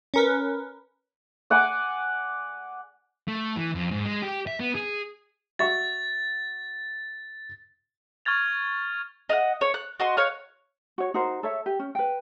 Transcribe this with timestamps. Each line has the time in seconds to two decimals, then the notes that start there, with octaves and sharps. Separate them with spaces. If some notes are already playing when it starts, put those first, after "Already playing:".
0.14 C#4 A#4 B4
1.50 D5 F#5 G#5 D6
3.28 A3
3.57 E3
3.75 F2
3.91 G#2
4.05 G#3
4.22 G4
4.47 E5
4.60 B3
4.75 G#4
5.59 F#4 E5 C#6 A6
8.25 C#6 F6 G#6 A6 F7
9.29 D#5 F5 F#5
9.61 C#5
9.74 F#6
10.00 F#4 D#5 C6
10.17 C#5 F5 F#6
10.98 F#4 C#5
11.14 D#4 F#4 A#4 C5
11.43 A4 C#5 E5
11.66 G4
11.79 C#4
11.95 B4 G5